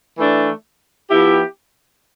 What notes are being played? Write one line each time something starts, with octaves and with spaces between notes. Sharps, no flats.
E3 A3 D4
F3 B3 E4 G4